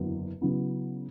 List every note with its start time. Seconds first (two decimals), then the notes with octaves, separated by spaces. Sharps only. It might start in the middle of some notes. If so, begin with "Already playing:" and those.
Already playing: F#1 E2 D3 F#3 B3
0.41 C#3 F#3 B3 E4